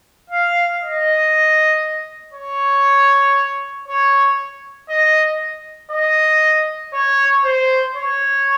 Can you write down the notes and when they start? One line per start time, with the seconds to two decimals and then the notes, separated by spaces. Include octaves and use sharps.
0.30 F5
0.81 D#5
2.34 C#5
3.88 C#5
4.89 D#5
5.91 D#5
6.93 C#5
7.44 C5
7.95 C#5